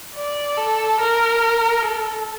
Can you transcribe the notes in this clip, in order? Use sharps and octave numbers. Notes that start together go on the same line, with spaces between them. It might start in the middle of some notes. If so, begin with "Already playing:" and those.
D5
A4
A#4
A4